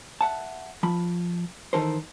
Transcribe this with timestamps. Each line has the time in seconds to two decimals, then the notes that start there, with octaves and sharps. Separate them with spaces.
0.21 E5 F#5 A5
0.83 F3 B5
1.73 D#3 E3 D#4 A4 A#4 C5